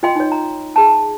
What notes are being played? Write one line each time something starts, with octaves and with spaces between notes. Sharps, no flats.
F4 D#5 G5 C6
D#4 C#5
A#5
G#4 A5